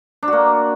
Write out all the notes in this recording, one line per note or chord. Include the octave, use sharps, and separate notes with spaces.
D4
F#4
A#3